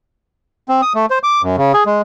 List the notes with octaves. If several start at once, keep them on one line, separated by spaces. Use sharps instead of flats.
C4
D#6
A3
C5
D6
F#2
C#3
G#4
G#3